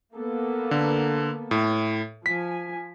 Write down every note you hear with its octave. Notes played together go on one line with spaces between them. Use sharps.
A#3 B3 A4
D3
A2
F3 G#5 B6